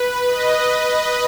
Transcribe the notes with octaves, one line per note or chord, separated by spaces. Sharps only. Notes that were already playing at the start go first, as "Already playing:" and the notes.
Already playing: B4
D#5
D#5